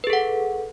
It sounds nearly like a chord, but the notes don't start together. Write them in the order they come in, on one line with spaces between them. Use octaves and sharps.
B4 G#4 A4 F#5